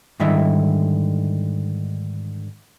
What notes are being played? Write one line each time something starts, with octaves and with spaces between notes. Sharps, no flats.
G#2 D3 D#3 G3 E4 E5